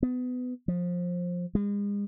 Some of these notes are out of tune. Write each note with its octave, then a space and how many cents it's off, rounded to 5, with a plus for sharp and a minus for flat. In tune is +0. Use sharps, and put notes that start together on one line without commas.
B3 +25
F3 +20
G#3 -40